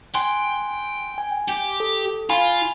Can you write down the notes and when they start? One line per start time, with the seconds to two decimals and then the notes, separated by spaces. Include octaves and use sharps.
0.14 G5 G#5 C6 F#6
1.18 G#5
1.49 G4
1.80 A4
2.30 F4 G#5 B5